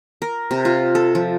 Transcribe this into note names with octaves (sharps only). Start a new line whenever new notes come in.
A#4
C3
F4
A4
F3